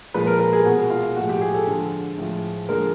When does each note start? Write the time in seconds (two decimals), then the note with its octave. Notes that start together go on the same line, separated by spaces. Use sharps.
0.14 A#2 F3 G#3 B4
0.27 A#4
0.39 A#4
0.53 G#4
0.65 B2 G#3 F#4
0.90 F4
1.16 A2 F3 G#3 F#4
1.29 G4
1.41 G#4
1.54 A4
1.67 D3 F3 G#3
2.18 A2 F3 G#3
2.69 D3 F3 G#3 A#4